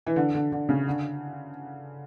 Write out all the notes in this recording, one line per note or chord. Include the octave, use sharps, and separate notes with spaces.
E3
D3
D3
D3
C#3
D3